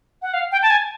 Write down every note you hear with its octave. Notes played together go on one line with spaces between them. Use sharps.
F#5
F5
G5
A5
G#5